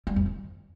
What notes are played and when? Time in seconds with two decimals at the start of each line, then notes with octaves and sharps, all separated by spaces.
0.07 G3
0.16 F2
0.26 D#3